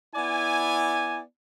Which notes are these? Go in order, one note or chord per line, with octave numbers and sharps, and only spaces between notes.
B3 E4 D5 G#5